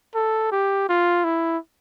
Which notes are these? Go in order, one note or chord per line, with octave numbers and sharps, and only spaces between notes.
A4
G4
F4
E4